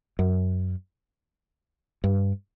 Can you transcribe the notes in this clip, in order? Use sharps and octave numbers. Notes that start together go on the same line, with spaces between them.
F#2
G2